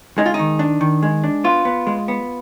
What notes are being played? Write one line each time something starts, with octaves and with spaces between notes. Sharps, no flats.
G#3 D#4
F4
D#4
D#3
D4
D#3
G#3
D4
B3 F4
B3
G#3
B3